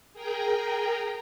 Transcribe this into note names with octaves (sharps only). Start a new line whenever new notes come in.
G#4 A#4 G5 A#5